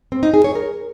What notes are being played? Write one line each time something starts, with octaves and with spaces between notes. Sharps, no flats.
C4
D#4
G#4
C#5
A#4